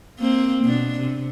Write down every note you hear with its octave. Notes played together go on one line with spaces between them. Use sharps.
A#3 C4
B2 D4
C3